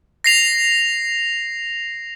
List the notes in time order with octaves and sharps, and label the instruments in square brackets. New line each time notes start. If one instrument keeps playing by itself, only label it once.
[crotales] A#6 C7 F7